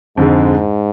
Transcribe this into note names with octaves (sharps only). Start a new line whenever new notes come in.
F2 G#2 D3 G#3